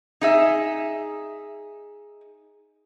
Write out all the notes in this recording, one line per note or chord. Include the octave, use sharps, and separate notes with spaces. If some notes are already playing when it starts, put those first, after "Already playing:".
D#4 G#4 E5